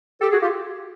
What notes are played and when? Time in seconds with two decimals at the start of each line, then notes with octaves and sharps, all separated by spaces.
0.21 G4 A4
0.32 F#4 G#4
0.42 F4 G4